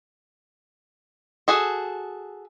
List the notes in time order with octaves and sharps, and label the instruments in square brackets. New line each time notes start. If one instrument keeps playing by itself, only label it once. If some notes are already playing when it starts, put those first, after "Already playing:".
[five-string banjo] F#4 G#4 A4